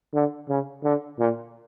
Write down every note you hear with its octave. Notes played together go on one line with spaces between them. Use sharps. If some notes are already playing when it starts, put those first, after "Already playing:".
D3
C#3
D3
A#2